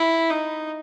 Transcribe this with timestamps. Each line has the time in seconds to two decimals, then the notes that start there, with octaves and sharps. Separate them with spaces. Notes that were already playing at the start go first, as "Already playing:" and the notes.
Already playing: E4
0.30 D#4